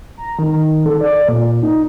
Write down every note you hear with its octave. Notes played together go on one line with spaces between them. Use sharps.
A#5
D#3
A4
D5
A#2
D#4